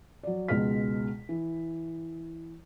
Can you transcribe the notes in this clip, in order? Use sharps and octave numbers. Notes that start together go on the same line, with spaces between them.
F#3 D5
C#2 B2 G#3 F6 B6
E3